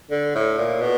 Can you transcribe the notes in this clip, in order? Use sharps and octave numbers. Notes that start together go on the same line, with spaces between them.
D3
A2
A#2
B2